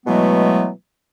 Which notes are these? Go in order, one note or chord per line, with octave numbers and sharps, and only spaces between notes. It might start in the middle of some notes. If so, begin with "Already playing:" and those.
B2 E3 F#3 G#3 A3 B3